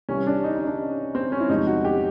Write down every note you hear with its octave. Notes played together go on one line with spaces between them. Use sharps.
C2 C3 E3 G3 C#4
D4
D#4
D#4
D4
C4
C#4
E4
E2 C3 F3 G#3 D#4
F#4
G4